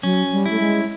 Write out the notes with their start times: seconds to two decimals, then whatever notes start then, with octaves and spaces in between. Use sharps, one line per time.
0.03 F#3 C#4
0.32 G3
0.46 A3 E4
0.60 G#3